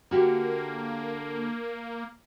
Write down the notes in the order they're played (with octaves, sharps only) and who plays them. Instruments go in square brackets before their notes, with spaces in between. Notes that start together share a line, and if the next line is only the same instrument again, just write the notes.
[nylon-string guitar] D3 F#4 G4 [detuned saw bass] A#3